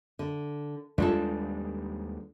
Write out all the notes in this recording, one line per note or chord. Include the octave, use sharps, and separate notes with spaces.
D3
D#2 G3 G#3 D4 F4 A4